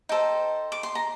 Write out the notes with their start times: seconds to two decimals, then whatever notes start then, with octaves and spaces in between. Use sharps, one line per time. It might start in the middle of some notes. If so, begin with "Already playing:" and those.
0.09 D#4 A4 C5 G5
0.72 D6
0.83 C6
0.95 A#5